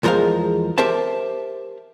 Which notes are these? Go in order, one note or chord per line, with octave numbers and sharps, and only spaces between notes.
E2 F3 G#3 A#4 C5 F5
G4 A#4 C5 E5 A5